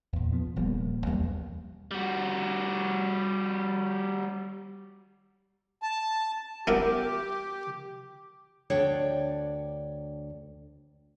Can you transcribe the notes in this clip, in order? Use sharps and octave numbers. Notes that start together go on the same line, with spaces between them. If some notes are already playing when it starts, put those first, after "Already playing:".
E2 A#2
F3 B3
D#1 F3 G3 A#3
B1 E2 G3 A#3
G3 F#4
A5
B3 E4 G4 A#4
D2 D4 C#5 D5 G5